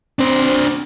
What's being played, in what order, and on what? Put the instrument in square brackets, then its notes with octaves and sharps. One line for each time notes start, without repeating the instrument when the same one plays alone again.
[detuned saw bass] C4 [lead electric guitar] D4 C5